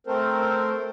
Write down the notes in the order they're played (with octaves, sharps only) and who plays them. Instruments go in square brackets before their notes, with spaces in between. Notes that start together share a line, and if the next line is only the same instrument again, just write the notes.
[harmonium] A3 C4 A4 A#4 C5